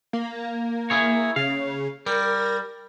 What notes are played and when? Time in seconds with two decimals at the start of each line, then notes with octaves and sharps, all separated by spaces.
0.13 A#3
0.90 E4 G#4 C#5
1.36 C#3 F5
2.06 G3 A#4